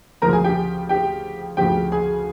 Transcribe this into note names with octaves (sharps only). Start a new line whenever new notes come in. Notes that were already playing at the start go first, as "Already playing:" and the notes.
D2 C#3 F3 A#4 A#5
G#4 G#5
G4 G5
G4 G5
D2 C#3 F3 G4 G5
G#4 G#5